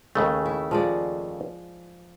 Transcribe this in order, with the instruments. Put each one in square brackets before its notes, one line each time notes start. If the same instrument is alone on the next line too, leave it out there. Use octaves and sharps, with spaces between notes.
[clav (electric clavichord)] D#2 C#3 A3 [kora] G#3
[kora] E4
F3 G#3 D5